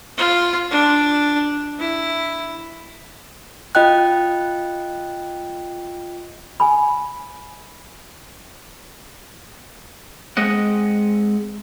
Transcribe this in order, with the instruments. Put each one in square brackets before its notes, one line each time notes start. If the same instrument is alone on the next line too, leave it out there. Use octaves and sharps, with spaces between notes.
[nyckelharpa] F4
D4
E4
[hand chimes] F4 D#5 G5 F#6
[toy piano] G#5 B5
[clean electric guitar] G#3 C4 D#5 F#5